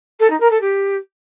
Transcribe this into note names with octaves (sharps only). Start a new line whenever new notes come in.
A4
D#4
A#4
A4
G4